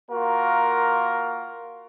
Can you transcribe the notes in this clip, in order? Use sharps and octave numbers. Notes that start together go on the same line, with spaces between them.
A#3 F4 F#4 A#4